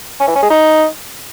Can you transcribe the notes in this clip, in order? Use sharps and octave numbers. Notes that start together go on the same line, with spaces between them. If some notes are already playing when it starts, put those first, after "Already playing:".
C#4
E3
C#4
G#3
D#4